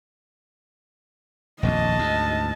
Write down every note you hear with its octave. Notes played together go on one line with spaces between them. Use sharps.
D#1 A#1 F2 D#5 A5
D2 G#2